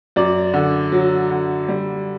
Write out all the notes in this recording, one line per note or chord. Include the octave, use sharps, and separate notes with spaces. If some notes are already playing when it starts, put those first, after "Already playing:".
F#2 D5
D3
F#3
D3
G3